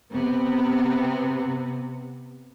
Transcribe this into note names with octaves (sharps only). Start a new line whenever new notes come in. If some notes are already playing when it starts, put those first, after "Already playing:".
C3 B3